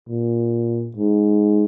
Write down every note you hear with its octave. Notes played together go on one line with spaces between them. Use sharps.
A#2
G#2